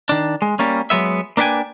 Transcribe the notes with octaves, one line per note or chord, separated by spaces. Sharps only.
D#3 D4
G#3
G3 A#3 C#4
F#3 G#3 B3 E5
A#3 D4 B4 E5 G5 G#5